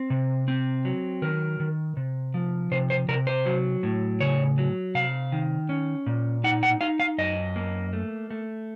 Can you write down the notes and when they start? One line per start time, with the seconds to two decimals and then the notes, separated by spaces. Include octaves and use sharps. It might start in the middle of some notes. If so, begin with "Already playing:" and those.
Already playing: C4
0.10 C3
0.48 C4
0.85 F#3
1.22 D#3 A#4
1.60 D#3
1.97 C3
2.34 F3
2.72 C3 C5
2.90 C5
3.08 C3 A#4
3.27 C5
3.46 F#3
3.83 A2
4.20 C#3 C#5
4.58 F#3
4.95 C3 F5
5.32 D#3
5.69 C#4
6.06 A#2
6.44 D#4 F#5
6.63 F#5
6.81 D#4 F5
7.00 F5
7.18 F#2 D#5
7.56 A#3
7.93 A3
8.31 A3